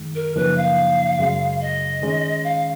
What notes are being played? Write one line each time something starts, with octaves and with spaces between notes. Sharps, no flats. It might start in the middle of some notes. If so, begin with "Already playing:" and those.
Already playing: F#2 D#3 G#3
A#4
F#2 C#3 F3 A#3 D#4 B4
F5
F#2 C#3 G#3
D#5
D#3 G#3 C#4
F5